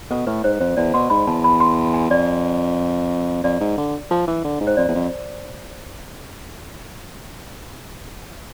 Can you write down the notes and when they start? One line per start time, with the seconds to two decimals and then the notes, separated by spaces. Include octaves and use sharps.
0.10 B2 A4
0.27 A2 B4
0.44 G#2 C5
0.60 F2 C5
0.77 E2 D5
0.94 B2 C6
1.10 G#2 B5
1.27 E2 A5
1.44 B5
1.60 C6
1.94 G#5
2.10 F2 D5
3.44 F2 D5
3.60 G#2
3.78 D3
4.11 F3
4.27 E3
4.44 D3
4.61 G#2
4.67 C5
4.77 F2 D5
4.88 E2
4.95 F2